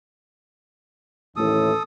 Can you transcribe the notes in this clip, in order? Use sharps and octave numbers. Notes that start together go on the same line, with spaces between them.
A1 D#2 A2 A4 D#6